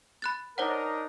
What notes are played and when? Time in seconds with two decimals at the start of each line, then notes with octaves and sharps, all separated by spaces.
0.22 B5 F#6 A6
0.58 D4 D#4 A#4 C5 C#5 F#5